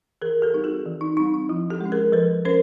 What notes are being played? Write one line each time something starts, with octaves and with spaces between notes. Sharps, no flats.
E3 G#4 A#4
G4 A4
G3 C4 D#4
F#4 G#4
E3
D#4
G3 C4 D#4
D#4
F3 E4
G4 A4
G#3 C#4
G#4 A#4
F3 A4 B4
C#4 A#4 C5